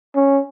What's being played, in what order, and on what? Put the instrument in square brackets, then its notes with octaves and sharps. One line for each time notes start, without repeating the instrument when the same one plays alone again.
[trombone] C#4